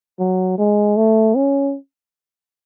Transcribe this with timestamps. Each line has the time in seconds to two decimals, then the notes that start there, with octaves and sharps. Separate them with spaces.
0.20 F#3
0.58 G#3
0.97 A3
1.36 C#4